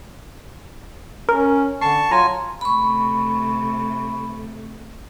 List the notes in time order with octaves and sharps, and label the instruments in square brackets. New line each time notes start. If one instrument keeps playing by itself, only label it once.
[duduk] C#4 [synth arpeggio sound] A#4
[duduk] D3 [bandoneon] A5 C#6 [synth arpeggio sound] C7
[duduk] F#3 [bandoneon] F4 G#5 [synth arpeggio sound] A#5
[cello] C3 A3 [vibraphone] B5 C#6